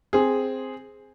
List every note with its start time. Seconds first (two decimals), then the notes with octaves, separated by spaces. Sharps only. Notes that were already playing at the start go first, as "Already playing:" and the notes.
0.13 C4 G#4